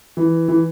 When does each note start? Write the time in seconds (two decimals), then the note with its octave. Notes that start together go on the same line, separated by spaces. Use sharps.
0.17 E3
0.48 E3